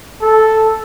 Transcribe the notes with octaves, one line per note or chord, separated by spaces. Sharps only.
A4